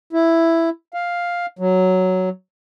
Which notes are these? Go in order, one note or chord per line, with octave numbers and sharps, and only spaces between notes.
E4
F5
F#3